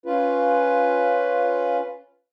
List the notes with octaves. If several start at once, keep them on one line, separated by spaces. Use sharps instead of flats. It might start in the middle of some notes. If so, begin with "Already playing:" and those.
C#4 F4 B4